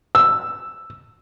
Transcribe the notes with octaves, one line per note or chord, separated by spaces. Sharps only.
E6